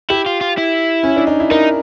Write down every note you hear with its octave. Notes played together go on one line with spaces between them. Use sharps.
E4 G4
F4
F4
E4
C#4
D4
D#4
E4
D#4 A#4